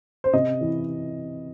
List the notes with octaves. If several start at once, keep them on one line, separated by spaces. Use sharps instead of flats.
C5
C3 D#5
E3